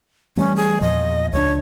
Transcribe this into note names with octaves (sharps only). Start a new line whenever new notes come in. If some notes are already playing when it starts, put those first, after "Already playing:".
E3 G3 A3 C#4
G#4
E2 A#2 F3 D#5
C#2 F3 D4 C#5